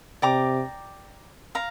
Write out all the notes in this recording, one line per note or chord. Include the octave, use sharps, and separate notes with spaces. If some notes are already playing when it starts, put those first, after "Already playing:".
C3 D5 G5 A#5 D6
F5 A#5